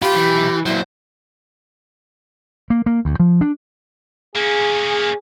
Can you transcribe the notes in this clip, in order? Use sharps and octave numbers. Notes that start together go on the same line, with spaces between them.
B1 F4 G4 B5
E3
A#2 F#3 E4 C5
A#3
A#3
D2
F3
D4
A#3 C#4 G#4